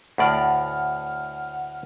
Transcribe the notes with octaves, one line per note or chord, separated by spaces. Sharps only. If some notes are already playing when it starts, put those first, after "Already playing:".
D2 A2 D5 F#5 F6